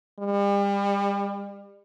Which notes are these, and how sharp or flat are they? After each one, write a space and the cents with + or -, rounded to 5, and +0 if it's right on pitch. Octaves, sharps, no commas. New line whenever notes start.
G3 +35